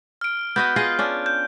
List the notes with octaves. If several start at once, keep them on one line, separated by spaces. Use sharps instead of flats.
F6 D7
B3 F#4 D#5 G6
F4 G#4 D#5
C#4 D4
G6